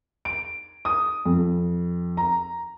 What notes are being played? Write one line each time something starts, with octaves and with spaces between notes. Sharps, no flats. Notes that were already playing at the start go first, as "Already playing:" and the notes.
D7
D#6
F2
A#5